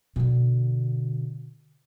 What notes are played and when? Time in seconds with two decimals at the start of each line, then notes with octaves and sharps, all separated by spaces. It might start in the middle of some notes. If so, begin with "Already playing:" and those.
0.16 B2 D3